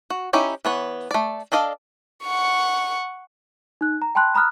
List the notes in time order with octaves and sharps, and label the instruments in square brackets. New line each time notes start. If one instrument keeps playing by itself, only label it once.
[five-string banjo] F#4
C#4 D#4 E4 G4 C#5
E3 B3 C#5
A3 D5
D4 A4 D5 D#5 F5
[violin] F#5 C#6
[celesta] D#4 F#6
A#5
G5 A5 B5 C6 F#6
A#5 B5 D#6 F6 F#6